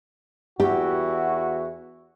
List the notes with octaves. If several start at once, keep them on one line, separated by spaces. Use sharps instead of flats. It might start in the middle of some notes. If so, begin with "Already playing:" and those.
E2 E4 F#4 G4